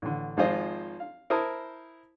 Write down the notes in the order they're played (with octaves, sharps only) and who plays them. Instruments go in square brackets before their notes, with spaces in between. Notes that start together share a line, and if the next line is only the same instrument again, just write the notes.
[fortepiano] A1 D3
G#1 F3 G#3 F4 C5 D#5
F5
E4 A#4 C5 A5 D#6